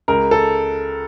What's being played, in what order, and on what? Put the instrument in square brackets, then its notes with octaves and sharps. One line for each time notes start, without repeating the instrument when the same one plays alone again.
[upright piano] C#2 A#4
A4